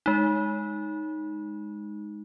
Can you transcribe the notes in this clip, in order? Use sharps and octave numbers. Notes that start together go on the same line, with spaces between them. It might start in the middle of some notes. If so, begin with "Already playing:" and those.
G#3 D#4